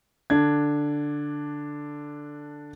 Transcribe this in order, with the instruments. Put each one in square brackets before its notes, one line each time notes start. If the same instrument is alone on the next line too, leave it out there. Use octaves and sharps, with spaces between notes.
[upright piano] D3 D4 G#6